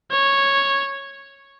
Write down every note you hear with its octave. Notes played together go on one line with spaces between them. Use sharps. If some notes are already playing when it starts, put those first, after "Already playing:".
C#5